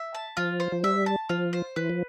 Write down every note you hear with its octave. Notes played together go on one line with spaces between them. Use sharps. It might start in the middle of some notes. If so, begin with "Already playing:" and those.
Already playing: E5
A5
F3 F4
C5
F3
G3 E5
A5
F3 F4
C5
E3 B4
F3